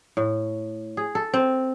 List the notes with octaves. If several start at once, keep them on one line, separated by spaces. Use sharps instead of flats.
A2
G#4
A4
C4